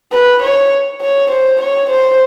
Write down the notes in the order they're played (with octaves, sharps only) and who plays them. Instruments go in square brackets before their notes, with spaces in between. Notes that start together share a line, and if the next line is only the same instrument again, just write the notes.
[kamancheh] B4
C#5
C#5
C5
C#5
C5